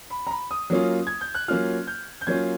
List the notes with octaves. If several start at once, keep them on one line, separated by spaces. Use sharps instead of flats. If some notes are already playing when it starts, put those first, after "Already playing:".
B5
A#5
B5
D#6
F#3 A#3 C#4 F4
G#6
G6
F#6
F#3 A#3 C#4 F4 F6
G6
G6
F#3 A#3 C#4 F4 G#6